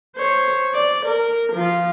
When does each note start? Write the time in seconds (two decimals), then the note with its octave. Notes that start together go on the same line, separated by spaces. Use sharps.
0.17 C5 C#5
0.74 D5
1.06 A#4
1.53 F3 F4